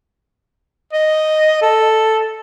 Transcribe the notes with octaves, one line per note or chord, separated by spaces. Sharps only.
D#5
A4